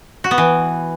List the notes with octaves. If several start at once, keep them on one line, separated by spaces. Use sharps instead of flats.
F#4
B3
E3